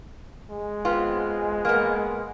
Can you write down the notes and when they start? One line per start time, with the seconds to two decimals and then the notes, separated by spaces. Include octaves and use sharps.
0.50 G#3
0.85 B3 C4 F4
1.65 A#3 B3